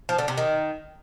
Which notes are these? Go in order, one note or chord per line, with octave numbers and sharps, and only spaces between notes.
F3
D3
C3
D#3